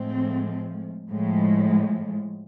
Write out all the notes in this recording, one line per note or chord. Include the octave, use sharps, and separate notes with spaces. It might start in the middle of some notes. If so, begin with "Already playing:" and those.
Already playing: A2 F3 G#3 C4
A2 F3 G#3